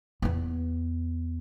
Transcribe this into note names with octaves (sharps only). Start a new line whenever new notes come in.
E2 B3